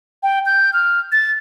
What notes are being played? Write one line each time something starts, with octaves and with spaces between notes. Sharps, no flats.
G5
G6
F6
A6